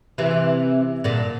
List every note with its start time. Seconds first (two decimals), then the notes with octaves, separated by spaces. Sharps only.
0.18 C3 E3
1.04 A#2 D3